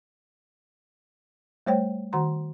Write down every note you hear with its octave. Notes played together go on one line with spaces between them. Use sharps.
G3 A3 C5 C#5 G5
D#3 F#4 F#5 A#5 C6